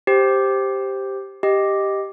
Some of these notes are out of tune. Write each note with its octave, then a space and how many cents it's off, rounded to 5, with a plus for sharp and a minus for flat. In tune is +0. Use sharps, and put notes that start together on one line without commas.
G4 +0 C5 +0
G4 +0 D#5 +0